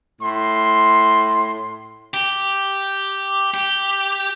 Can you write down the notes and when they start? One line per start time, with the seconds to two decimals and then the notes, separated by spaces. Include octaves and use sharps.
0.21 A2 C6
2.14 G4
3.54 G4